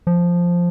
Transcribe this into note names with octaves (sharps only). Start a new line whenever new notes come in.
F3